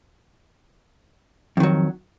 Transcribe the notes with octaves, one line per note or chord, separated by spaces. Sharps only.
F2 D#3 F#3